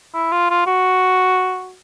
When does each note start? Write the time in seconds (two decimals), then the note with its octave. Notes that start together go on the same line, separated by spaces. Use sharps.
0.14 E4
0.32 F4
0.50 F4
0.67 F#4